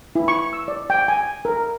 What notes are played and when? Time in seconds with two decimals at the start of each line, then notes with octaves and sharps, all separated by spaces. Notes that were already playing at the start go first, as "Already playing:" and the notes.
0.15 E4
0.28 C#6
0.53 E6
0.68 D5
0.90 G5
1.08 G#5
1.45 A#4